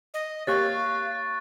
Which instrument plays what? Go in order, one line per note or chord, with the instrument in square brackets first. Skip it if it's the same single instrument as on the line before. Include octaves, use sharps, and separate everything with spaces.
[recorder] D#5
[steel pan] A#3 G4 C#5 [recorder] F5 [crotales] C#6 F#6 A6